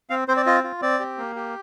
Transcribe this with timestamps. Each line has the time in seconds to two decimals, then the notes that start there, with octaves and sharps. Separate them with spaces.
0.10 C4 F5
0.28 C4 C5
0.37 D5
0.46 F4 D#5
0.64 F4
0.82 C4 D5
0.99 G4
1.18 A#3
1.36 G4